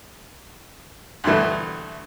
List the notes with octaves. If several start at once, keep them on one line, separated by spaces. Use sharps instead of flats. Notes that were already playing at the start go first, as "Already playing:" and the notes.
D2 G2 B2 E3 A3